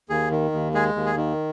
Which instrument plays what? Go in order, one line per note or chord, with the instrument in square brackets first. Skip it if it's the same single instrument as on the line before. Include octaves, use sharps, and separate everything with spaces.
[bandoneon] D#2 G#4
D#3
D#2
G#3 G#4
D#2
G#4
D#3